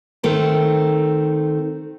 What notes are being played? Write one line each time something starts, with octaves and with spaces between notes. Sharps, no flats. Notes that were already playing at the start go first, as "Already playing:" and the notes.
D#3 A3 C4